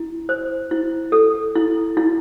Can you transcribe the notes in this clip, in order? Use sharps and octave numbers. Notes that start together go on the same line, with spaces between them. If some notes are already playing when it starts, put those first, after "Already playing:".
Already playing: E4
C5
E4
A4
E4
E4